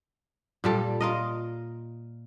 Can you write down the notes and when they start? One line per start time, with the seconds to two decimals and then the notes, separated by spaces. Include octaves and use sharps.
0.64 A#2 G3 A4
1.00 F4 A#4 D#5